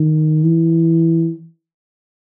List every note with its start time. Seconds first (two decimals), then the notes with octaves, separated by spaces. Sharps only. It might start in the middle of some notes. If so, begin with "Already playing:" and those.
Already playing: D#3
0.44 E3